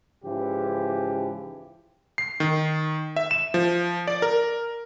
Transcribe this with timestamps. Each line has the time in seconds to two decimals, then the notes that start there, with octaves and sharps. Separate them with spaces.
0.24 G#2 C#3 E3 F3 G4
2.18 C7
2.40 D#3
3.16 E5
3.31 E7
3.54 F3
4.08 D5
4.22 A#4